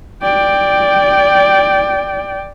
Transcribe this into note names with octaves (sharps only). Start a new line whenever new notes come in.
D5 G5